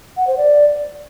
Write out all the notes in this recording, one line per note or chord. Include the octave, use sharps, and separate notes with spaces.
F#5
C5
D5